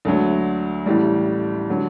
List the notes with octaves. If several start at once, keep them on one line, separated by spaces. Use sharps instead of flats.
D2 D3 F#3
A1 A2 G3
D3 F#3